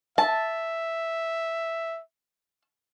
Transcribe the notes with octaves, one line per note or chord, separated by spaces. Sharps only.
E5 A5